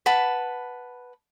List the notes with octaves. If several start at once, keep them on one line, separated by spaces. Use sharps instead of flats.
B4 F#5 A5 B5